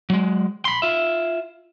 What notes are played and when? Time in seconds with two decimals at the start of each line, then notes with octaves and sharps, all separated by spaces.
0.10 F#3 G#3
0.65 B5 C6
0.82 F4 E5